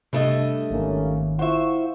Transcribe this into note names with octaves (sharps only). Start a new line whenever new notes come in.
G2 C3 A3 D#5
G#1 D#3 A#3 C#4
E4 F4 C5 E5 F#5 C#6